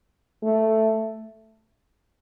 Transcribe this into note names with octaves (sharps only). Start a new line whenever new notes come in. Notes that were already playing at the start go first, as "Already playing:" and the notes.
A3